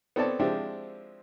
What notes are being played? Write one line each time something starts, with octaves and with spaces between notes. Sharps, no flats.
B3 C4 A4 C#5 D5 A5
F3 G#3 C4 D4 E4 G4